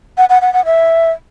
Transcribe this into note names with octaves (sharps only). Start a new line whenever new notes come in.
F#5
F#5
F#5
F#5
E5